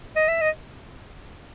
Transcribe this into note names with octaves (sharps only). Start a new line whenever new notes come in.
D#5
E5
D#5